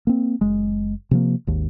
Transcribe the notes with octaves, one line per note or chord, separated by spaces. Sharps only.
A#3 C4
F#1 G#3
C3 F3 A#3
G#1 D#2